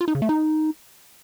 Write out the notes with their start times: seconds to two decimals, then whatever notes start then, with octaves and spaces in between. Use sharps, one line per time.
0.01 F4
0.08 D#4
0.15 C#3
0.22 A3
0.29 D#4